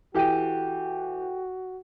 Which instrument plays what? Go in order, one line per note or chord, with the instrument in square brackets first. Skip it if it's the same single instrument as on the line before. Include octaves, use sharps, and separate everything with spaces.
[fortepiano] E3 G4 [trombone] F#4 [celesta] A4 G5 D#7